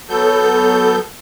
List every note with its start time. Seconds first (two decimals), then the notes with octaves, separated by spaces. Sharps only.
0.09 F#3 B3 A4 G6